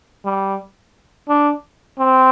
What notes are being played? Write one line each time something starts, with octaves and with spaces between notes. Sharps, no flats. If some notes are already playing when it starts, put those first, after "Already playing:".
G3
D4
C4